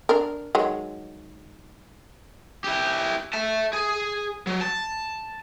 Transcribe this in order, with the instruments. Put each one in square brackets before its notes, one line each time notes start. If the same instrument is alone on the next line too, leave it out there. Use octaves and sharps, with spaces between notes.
[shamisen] D4 A#4
D#3 F#3 G#3
[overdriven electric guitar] E4 G4
E5 A5
G#4
F#3
A5